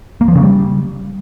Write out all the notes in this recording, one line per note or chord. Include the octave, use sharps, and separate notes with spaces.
A#3
F3
C#3
G3